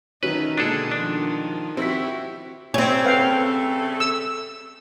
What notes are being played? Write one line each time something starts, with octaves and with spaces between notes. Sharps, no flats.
D#3 F#3 A3 C#4 D#4 B4
B2 D3 G#3 A#3 D4 G#4 A4
D#3 F3 D4
C4 E4 F#4 G4 E6 B6
G3 A3 C4 G4 C#5 G#5
C#3 G3 A3 B4 F5 G5
E6